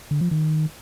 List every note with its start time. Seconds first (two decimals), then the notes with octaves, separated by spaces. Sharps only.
0.11 D3
0.21 F3
0.31 D#3